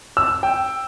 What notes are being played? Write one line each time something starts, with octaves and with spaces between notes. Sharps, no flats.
E6
G5